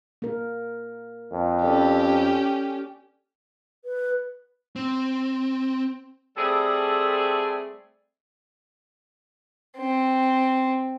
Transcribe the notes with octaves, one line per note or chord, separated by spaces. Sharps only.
A#3 A#4
F2
C#4 G4 A4 D5
B4
C4
G3 A3 C4 G#4 A4 D5
C4